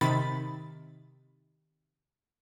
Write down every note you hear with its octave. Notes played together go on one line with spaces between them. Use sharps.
C3 D#3 B5 A6